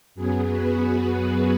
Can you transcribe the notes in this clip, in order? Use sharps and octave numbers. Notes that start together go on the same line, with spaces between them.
F#2 F#3 B3 G#4
F#4 B4
F#4 B4
G#4